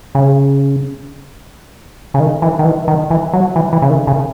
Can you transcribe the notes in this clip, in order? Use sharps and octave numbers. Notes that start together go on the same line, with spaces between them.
C#3
C#3
D#3
E3
D#3
E3
D#3
E3
F#3
E3
E3
C#3
D#3
C#3